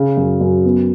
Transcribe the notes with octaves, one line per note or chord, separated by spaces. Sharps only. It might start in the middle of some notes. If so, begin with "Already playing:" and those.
Already playing: C#3
F#2
F#2
B3